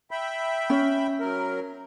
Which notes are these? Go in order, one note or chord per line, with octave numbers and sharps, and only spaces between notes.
E5 G5 B5
C#4
F#3 A#4